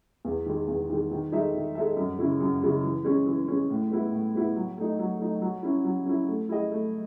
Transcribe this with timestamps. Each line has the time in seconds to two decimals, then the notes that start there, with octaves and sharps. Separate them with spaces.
0.25 E2
0.46 D#3 G#3
0.68 E2
0.89 D#3 G#3
1.11 D#3
1.32 G#3 D#4 A4 E5
1.54 D#3
1.75 G#3 D#4 A4 E5
1.96 F#2
2.18 C#3 G#3 C#4 E4
2.40 F#2
2.62 C#3 G#3 C#4 E4
2.83 E3
3.04 G#3 C#4
3.26 E3
3.48 G#3 C#4
3.70 A2
3.90 G#3 B3 E4
4.12 A2
4.35 G#3 B3 E4
4.56 F#3
4.78 A3 D#4
4.99 F#3
5.20 A3 D#4
5.42 F#3
5.63 C#4 E4
5.84 F#3
6.06 C#4 E4
6.28 A3
6.49 E4 G#4 D#5
6.72 A3